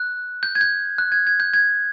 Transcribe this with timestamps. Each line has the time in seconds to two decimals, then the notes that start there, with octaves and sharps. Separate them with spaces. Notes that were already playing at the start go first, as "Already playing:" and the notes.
Already playing: F#6
0.43 G6
0.55 G#6
0.61 G6
0.98 F#6
1.12 G#6
1.27 G#6
1.40 G6
1.54 G#6